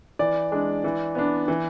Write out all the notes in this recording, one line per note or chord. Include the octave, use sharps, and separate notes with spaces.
E3 D5
G#3 D4
E3
B3 D4
E3